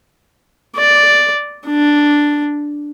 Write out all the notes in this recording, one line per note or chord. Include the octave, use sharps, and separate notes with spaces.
D5
D4